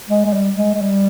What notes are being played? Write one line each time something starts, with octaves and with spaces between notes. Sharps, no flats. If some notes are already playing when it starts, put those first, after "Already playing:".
G#3
G#3
G3
G#3
G#3
G3